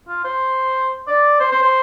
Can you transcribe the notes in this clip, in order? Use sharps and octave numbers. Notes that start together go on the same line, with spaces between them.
F4
C5
D5
C5
C5
C5